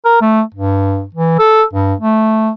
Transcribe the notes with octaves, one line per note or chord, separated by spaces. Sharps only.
A#4
A3
G2
E3
A4
G2
A3